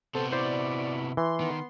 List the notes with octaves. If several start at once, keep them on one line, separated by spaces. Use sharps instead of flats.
C3 B3 A4 C5
E4 C5 D5
E3 C6
D#3 B3